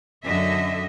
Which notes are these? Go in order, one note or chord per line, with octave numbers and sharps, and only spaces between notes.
F#2 D3 D#5 E5